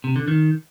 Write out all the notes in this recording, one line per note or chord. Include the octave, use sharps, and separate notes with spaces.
C3
D3
D#3